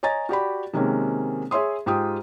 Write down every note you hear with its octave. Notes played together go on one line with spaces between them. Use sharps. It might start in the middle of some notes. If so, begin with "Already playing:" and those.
C#5 D#5 G#5 A#5 A6
F#4 G4 D5 B5
C3 D#3 G#3 A#3 C4 C#4
G#4 C#5 E5 C6 D#6
G#2 F4 G4 G5 D#6